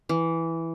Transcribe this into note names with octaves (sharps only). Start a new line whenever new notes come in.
E3